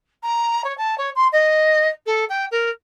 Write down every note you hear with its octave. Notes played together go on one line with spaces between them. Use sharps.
A#5
C#5
A5
C#5
C6
D#5
A4
G5
A#4